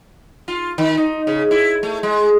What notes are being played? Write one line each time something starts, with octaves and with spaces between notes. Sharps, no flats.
F4
D#3
D#4
C#3
E4
A3
G#3